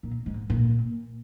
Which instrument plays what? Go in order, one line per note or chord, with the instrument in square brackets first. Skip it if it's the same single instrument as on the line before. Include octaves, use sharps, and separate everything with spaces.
[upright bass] A#2
G#2
A#2